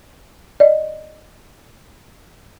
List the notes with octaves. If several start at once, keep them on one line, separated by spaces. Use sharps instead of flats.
D5 D#5